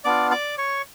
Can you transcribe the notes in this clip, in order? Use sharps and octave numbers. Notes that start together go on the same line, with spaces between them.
B3 D4 F4 D5 D6
D5 D6
C#5 C#6